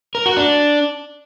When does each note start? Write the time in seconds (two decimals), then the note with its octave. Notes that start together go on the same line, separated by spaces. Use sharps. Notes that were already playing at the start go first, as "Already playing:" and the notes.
0.15 A#4
0.26 F#4
0.37 D4